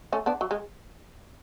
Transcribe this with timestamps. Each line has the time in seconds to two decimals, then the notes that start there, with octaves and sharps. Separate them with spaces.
0.13 A3 C#4
0.26 B3 D4
0.41 F#3
0.51 G#3